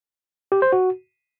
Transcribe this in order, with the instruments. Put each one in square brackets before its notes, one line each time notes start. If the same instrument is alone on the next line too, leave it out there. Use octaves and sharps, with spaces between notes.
[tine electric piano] G4
C5
F#4